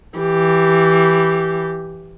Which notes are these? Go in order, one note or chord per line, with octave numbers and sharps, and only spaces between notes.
E3 G4